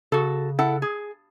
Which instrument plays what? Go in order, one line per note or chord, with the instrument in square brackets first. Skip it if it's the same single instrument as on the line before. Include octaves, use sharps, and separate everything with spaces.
[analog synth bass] C#3 [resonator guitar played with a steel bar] F#4 A4
[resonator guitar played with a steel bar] E4 A4 F#5
G#4